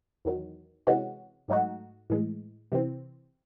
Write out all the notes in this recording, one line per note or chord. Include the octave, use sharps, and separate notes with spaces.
E2 D#3 F#3
C3 E3 G#3 C#4 F#4
G#2 F#3 A3 D#4 F#4
A2 E3 G#3
C3 E3 C4